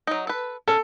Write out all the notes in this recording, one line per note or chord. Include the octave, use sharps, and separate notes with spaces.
F#3 D#4
A4 B4
C#4 A4